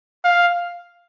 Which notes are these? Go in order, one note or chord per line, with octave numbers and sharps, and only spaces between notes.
F5